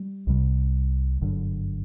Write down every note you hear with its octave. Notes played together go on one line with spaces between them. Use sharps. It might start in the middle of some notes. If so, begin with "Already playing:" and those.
Already playing: G3
C2 C3 G3
G1 F#2 D3